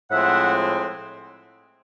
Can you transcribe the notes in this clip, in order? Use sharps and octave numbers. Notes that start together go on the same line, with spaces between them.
A2 F3 G#3 C4 E5 F#5